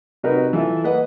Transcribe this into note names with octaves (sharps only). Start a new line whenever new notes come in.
C3 D#4 F#4 A#4 B4 D#5
E3 F4 A4 E5
A#3 B4 D#5 F#5